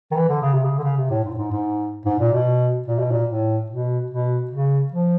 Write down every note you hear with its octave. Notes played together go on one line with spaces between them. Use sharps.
D#3
E3
D3
C#3
C3
C#3
D3
C#3
C3
A2
G#2
A2
G#2
G#2
G#2
A#2
B2
A#2
B2
A#2
A2
B2
B2
C#3
F3